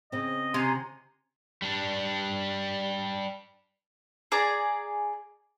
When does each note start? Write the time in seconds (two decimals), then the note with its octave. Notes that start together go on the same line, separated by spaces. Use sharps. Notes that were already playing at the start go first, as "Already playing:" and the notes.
0.12 C#3 C4 D#5
0.54 C3 G#5 A#5 C6
1.62 G3 D4
4.32 G#4 D5 A#5